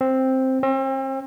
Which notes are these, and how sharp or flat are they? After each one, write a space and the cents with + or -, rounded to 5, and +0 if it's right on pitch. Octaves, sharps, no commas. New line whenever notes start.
C4 +5
C4 +40